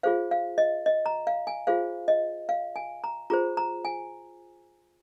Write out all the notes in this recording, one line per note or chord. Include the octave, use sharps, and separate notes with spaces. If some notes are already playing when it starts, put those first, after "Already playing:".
F4 G#4 C5 F5
F5
D#5
D#5
A#5
F5
G#5
F4 G#4 C5 F5
D#5
F5
G#5
A#5
F4 G#4 C5 A#5
A#5
G#5